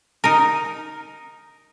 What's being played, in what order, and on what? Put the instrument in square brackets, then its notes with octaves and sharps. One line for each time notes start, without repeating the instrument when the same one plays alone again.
[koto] D#4 A#4